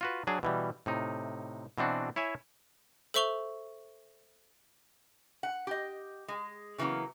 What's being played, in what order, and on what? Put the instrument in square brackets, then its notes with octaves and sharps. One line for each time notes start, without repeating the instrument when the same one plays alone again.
[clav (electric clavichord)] F4 F#4 B4
F#3 D4 G#4
B2 E3 G3
A2 C3 D#4
B2 E3 C4 D4 F#4
E4 C#5 E5 G#5
[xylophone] A4 C5 E5 C#6 F7 G7
[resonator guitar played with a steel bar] F#5
G4 D#5
G#3
C#3 E3 F#3 A#3 B3